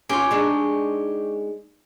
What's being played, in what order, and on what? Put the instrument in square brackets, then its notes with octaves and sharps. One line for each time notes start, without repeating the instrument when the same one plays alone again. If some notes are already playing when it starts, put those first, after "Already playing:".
[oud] C#4 F4 [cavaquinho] G4 C#5 G#5
[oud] G#3 D4 D#4